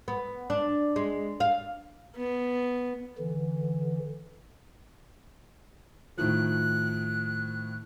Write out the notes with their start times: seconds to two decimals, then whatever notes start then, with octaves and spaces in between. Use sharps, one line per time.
0.08 B3
0.50 D4
0.96 G#3
1.40 F5
2.16 B3
3.18 D3 E3
6.17 A2 D#3 F3 F#6